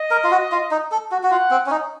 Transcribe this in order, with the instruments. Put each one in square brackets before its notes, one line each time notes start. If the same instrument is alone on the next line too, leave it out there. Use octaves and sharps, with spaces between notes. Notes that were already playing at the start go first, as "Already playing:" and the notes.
Already playing: [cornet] D#5
[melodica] A#4
F4
F#4
F4
D#4
A4
F#4
F#4
[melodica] F4 [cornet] F#5
[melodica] C4
C#4
D#4